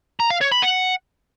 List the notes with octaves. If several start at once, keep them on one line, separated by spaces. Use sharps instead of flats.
A#5
F5
C#5
B5
F#5